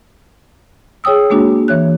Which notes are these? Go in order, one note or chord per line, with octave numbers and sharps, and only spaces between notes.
G#4 C#5 G5 D#6 E6
G#3 A#3 D4 F#4
E3 C#5 F#6